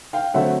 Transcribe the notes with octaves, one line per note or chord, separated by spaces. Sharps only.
F5 G5
D3 F#3 A3 C4 E5 F#5